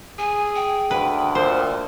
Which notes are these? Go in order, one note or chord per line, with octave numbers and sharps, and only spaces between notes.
G#4 G#5
G5
D2 B4
A#2 C5